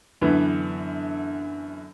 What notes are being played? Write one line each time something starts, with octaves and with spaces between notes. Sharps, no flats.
F#2 D3 E3 B3